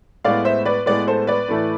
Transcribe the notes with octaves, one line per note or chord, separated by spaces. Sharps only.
A2 G#3 B3 D5 F5
C5 E5
B4 D5
A2 G#3 B3 B4 D5
A4 C5
B4 D5
A2 E3 A3